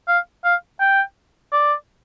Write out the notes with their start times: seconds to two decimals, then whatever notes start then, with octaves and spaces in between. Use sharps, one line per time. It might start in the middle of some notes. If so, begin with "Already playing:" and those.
0.08 F5
0.44 F5
0.80 G5
1.52 D5